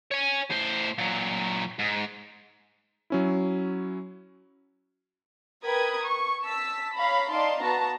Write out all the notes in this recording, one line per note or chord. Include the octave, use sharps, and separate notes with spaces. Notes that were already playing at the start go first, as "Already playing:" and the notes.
C#5 G#5
A2 C5
A#2 F#3
G#2
F#3 C#4 E4
A#4 B4 G5 B5 D#6 G#6
C#6
A5 E6 B6
C#5 F5 A#5 B5
D#4 D5 F5 A5 C6
B3 F#4 A5 A#5